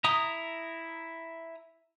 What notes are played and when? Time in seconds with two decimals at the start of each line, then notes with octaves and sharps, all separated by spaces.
0.04 E4 A#5 D#6